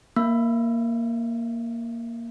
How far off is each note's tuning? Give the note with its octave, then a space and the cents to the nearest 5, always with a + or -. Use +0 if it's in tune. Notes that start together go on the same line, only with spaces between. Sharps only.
A#3 +0 F5 -45